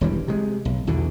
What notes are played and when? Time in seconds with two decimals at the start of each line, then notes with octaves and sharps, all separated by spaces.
0.01 E1 E3 G3
0.28 C3 G#3
0.65 B1
0.87 E2 B2 D3